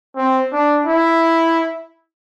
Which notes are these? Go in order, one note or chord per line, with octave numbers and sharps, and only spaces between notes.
C4
D4
E4